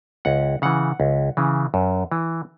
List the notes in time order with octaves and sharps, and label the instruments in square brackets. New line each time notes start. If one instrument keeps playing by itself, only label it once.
[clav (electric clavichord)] C#2 F#5
C#3 E3 F#5
C#2
C#3 E3
F#2
E3